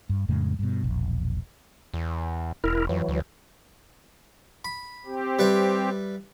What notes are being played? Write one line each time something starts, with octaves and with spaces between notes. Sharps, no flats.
G2
F2 A2 C#3 G#3
G2 B2
E1 A#1
E2
E1 E4 A#4
F2 E3 F#3
D2
B5
C4 G4
G3 B4 E5